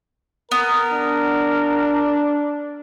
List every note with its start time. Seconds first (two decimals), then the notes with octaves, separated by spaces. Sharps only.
0.51 B3 A#4
0.92 D4